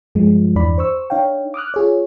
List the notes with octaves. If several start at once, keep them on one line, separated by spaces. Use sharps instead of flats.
G2 F3 G#3
E2 G2 E3 D4 D5 B5
C5 C#6 E6
D4 D#4 C#5 F5 G5
D6 D#6 F6 F#6
F4 G#4 C#5